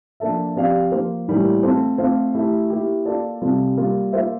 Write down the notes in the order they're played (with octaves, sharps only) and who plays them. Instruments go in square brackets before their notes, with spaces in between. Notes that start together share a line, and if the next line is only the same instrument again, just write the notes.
[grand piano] F3 A#3 D4 A4 E5
F3 C4 G4 D5 F5
F3 A#3 F4 C5
A2 E3 G3 A#3
A3 C4 F4 A4 C5
A3 C4 F4 C5 F5
A3 E4 G4
A#3 E4 G4
A#3 F4 A4 D5
C3 G3 C4 F4 A4
G3 A#3 F4
A#3 F4 C5 E5